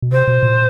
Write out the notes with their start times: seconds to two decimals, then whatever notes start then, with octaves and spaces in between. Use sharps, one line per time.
0.02 B2
0.12 C3 C5
0.28 B2
0.43 A#2